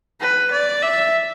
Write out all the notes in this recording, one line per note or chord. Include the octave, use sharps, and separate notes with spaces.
B4
D5
E5